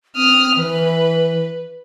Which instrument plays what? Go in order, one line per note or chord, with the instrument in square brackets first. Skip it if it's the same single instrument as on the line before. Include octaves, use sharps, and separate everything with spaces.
[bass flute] C4 [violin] D#6 F6
[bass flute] E3 [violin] B4